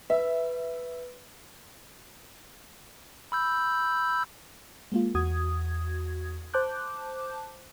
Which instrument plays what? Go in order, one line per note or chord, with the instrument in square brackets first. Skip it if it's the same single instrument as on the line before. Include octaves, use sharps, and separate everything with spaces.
[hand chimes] B4 [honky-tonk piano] E5
[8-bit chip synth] B5 E6 G6
[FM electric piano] G#3 A#3 F4
E2 F#4 D#6 G#6
C5 A5 D6 F#6 G6